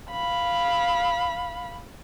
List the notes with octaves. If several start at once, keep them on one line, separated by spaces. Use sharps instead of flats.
F5 B5